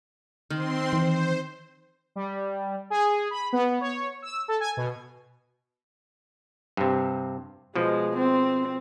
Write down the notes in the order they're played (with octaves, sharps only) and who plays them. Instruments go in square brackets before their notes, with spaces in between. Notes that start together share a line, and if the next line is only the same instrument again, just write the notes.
[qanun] D#3 [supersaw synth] C4 C6
[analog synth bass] E3 [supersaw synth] C5
[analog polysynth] G3
G#4
B5
B3
C#5
E6
A4
G#5
B2
[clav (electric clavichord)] G2 C3
[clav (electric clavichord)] B2 F3 [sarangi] G#3
[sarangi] C4